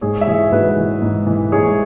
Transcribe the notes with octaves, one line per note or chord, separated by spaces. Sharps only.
G#2 G#4 C#5
E5
E3 G#4 C#5
G#2 F#4 B4
E3
G#2
E3
G#2 G#4 C#5